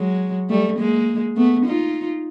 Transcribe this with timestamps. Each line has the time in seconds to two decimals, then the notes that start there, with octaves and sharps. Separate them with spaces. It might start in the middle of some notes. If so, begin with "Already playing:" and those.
Already playing: F#3 G#3
0.50 G3 A3
0.78 G#3 A#3
1.37 A3 B3
1.65 D#4 F4